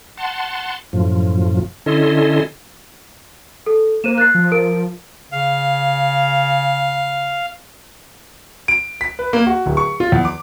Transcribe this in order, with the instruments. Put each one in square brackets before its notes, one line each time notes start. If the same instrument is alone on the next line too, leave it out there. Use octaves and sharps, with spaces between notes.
[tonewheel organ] F#5 A5 C6
F#2 A2 F3
D3 C#4 E4 A4 D#5 C6
[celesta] A4
[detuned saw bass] A#3 [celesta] C5 D#7 E7
[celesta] F#6 A6 C7
[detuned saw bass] F3
[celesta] A#4 C5 D7
[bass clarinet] C#3 [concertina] F5
[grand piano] D7
B6
B4
A#3
F#4
D1
C#6
F4
E2
D6